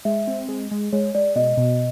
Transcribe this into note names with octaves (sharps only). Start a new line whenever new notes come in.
G#3 E5
C4
G#3
G#3
G#3 C#5
G#3 D5
B2 D#5
B2